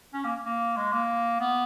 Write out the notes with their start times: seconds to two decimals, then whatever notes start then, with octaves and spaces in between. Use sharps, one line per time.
0.14 C#4
0.24 A#3
0.45 A#3
0.77 G#3
0.93 A#3
1.41 B3